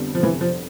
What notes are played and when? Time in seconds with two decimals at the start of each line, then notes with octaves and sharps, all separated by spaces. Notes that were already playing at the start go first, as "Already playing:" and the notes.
Already playing: F2 D3 G3 B3
0.15 F3
0.22 F2 E3
0.41 F3